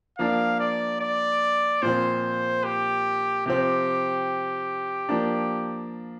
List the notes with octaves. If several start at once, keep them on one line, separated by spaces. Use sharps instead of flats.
F3 A#3 D4 F5
D5
D5
A#2 F3 C4 C5
G4
C3 F3 C4 G4
F3 A#3 D4